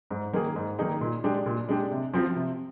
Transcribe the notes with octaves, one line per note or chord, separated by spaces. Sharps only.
G#2
D#3 A#3 D#4 G#4
G#2
D#3 A#3 D#4 G#4
A#2
G#3 D4 G4
A#2
G#3 D4 G4
C3
F3 C4 F4
C3